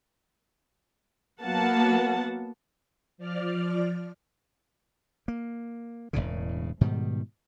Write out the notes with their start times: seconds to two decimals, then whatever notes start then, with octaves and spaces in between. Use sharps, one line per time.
1.43 F#3 A#3 B3 F#5 A5
3.18 F3 D5 F6
5.28 A#3
6.13 E1 A#1 A2 C#3
6.81 G#2 B2 D#3 G3